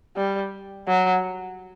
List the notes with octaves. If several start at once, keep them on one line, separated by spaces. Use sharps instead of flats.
G3
F#3